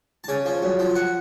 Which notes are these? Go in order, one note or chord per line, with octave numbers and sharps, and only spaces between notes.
A5
C#3 G#5
F3
F#2
F3
F#5